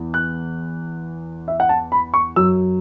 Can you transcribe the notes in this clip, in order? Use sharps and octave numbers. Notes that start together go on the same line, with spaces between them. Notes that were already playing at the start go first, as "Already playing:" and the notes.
Already playing: E2
F#6
E5
F#5
A5
B5
C#6
F#2 F#3 E6